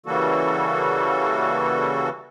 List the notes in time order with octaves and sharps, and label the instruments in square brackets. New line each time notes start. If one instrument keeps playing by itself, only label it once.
[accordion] C#3 E3 G3 A#3 F#4 A4